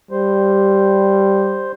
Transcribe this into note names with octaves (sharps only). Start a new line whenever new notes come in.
G3 C5